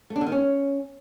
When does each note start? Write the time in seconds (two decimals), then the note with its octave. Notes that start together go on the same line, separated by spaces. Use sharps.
0.10 A3
0.16 D4
0.21 D3
0.26 D#3
0.32 C#4